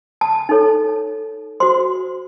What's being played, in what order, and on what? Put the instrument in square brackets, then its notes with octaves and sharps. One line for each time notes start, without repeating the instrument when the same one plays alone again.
[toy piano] A5
D#4 A4 C#5
F#4 C5 C6